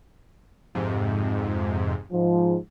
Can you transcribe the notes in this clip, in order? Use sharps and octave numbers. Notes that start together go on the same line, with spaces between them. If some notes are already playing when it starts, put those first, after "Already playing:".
F2 G#2 C3
G#2 F3